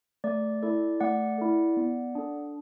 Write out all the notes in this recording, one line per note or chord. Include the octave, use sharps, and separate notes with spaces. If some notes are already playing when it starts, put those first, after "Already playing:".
A3 D5
E4 A4 D5
A3 D5 F#5
E4 A4
B3
D4 A4